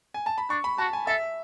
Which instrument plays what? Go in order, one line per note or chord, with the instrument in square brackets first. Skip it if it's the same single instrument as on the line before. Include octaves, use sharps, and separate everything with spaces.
[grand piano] G#5
A5
B5
[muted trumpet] D4 [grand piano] C#6
[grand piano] B5
[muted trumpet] F#4 [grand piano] A5
[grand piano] G#5
[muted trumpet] A4 [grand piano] E5